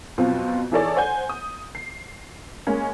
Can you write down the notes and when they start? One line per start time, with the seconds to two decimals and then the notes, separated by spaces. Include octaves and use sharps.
0.18 F2 B2 F#3 C4 F4
0.72 E3 D#4 G#4 A4 C#5 D5
0.96 C5 F#5 G#5 G6
1.29 D#6
1.75 C7
2.67 G#3 A#3 C#4